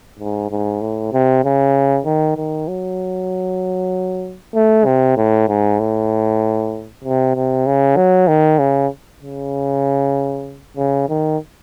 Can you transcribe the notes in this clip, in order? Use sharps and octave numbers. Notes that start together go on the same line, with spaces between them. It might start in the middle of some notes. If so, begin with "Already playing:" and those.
G#2
G#2
A2
C3
C#3
D#3
D#3
F#3
A3
C3
A2
G#2
A2
C3
C3
C#3
F#3
D#3
C#3
C#3
C#3
D#3